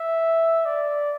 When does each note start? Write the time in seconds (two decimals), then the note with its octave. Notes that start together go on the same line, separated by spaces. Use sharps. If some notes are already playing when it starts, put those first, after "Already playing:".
Already playing: E5
0.65 D5